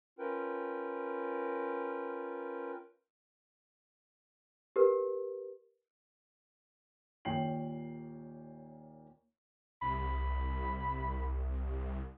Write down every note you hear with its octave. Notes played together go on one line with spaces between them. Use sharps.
C#4 F4 A#4 B4 G5
G4 A#4 B4
D#2 A#2 C#5 G5 C7 F#7
C2 B5